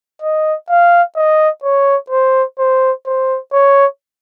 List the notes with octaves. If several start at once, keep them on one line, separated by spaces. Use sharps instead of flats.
D#5
F5
D#5
C#5
C5
C5
C5
C#5